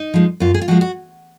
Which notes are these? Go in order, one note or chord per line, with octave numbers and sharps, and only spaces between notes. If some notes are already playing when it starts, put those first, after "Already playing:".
Already playing: D#4
F3 G#3
F#2 F4
G#4
F4
F3 G#3 F#4
F#4